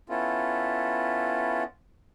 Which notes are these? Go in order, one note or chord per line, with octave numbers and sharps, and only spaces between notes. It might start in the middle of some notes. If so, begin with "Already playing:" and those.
B3 C#4 E4 F4 A4